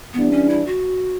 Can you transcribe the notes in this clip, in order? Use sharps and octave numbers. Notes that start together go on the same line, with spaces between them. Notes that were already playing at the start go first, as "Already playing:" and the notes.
E3 G3 B3 D4
C#4
E4
F#4